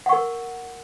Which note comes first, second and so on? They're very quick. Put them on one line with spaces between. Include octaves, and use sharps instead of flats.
F#5 C#6 A#4